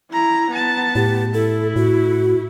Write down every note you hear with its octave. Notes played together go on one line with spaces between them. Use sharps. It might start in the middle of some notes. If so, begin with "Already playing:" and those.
E4 A#5
B3 A5
A2 G4
E4 A4
A2 F#4